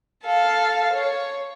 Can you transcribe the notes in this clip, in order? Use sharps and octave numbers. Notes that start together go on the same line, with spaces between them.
A4 F5
C#5